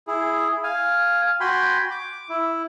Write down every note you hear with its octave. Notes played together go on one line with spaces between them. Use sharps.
E4 G#4
F5 G#5
F#4 G5 G#5 B5 C6
D6
E4